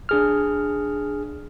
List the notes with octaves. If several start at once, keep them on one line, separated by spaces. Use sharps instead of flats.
D4 G#4 F6